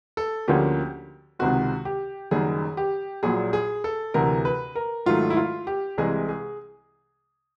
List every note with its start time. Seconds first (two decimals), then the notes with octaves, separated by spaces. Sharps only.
0.17 A4
0.48 D2 D3 F3 A#3 C#4 G4
1.39 C#2 C3 D#3 G#3 C4 F#4
1.85 G4
2.31 F#1 F#2 D#3 G3 G#4
2.77 G4
3.23 A#1 A#2 F#3 G#4
3.53 G#4
3.84 A4
4.14 D2 C3 E3 A#4
4.45 B4
4.75 A#4
5.06 G#2 D#3 F#3 A3 F4
5.30 E4
5.37 F4
5.67 G4
5.98 C2 C3 E3 G#3 G#4
6.29 G#4